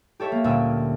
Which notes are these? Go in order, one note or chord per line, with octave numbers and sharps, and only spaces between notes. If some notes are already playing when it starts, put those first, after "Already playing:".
G4 A4 C#5 E5
A#3
D2 A#2 G3 C#4 E6